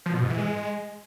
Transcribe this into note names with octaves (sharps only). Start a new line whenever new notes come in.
F3
B2
G#2
E3
G#3